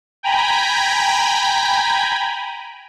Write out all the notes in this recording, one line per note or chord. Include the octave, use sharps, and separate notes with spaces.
G5 G#5 A#5 B5